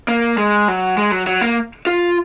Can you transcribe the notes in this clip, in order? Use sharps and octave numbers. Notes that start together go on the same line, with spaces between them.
A#3
G#3
F#3
G#3
F#3
F#3
A#3
F4